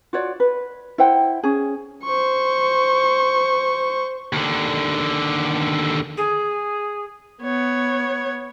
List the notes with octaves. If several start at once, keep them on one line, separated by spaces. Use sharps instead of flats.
F4 F#4 C#5 D5
B4
E4 C5 F#5 G5
C#4 G#4
C5 C#6
D#2 D3
G#4
B3 C#5